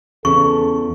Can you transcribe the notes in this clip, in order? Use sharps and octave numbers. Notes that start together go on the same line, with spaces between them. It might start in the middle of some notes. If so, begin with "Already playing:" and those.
E2 C#3 A4 C#6